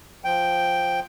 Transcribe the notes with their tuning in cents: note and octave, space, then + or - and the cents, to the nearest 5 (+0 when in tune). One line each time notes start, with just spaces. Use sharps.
F3 +0 G5 +0